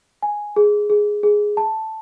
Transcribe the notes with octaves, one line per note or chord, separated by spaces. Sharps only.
G#5
G#4
G#4
G#4
A5